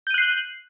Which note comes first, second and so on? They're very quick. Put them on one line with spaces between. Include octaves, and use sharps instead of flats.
G6 D#7 F#6 C7